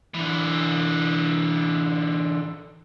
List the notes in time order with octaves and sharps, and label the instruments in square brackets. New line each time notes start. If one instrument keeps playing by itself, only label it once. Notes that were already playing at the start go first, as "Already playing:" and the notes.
[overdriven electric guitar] D3 E3